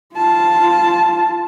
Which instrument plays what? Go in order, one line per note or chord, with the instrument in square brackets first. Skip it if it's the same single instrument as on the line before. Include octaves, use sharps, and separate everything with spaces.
[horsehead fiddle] F4 A5